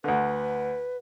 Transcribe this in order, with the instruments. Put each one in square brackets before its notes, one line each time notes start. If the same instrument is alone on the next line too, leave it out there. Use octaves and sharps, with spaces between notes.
[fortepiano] D2 D3 [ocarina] B4